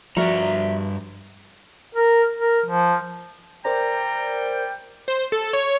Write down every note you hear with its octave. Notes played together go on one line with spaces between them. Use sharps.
G2 F3 F#4 A#4 D5 E5 A#5
A#4
A#4
F3
G3 A#4 C5 D5 G5 A#5
C5
A4
C#5